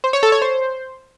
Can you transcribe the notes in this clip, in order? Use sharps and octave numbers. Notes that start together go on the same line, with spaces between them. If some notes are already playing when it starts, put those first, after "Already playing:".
C5
C#5
A4
C#5
C5